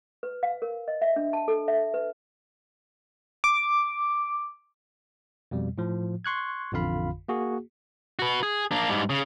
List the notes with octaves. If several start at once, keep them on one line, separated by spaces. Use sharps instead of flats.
B4
F5
A#4
D#5
E5
D4
A5
A4
E5
B4
D6
F2 B2 G3
A2 F3
C6 C#6 F#6 G#6
A1 F2 D3 F4 F5 B5
A#3 F#4 G#4
F#4 B4
G#4
A#3 D4
G#2 G3
C#3